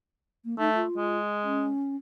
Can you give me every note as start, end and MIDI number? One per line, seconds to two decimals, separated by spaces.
0.45 0.58 58
0.59 0.82 57
0.59 0.73 63
0.75 1.18 65
0.97 1.71 56
1.44 1.96 61